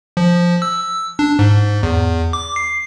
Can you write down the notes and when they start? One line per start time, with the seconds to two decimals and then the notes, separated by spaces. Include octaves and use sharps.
0.17 F3
0.62 E6
1.19 D4
1.39 G#2
1.83 E2
2.33 D6
2.56 C7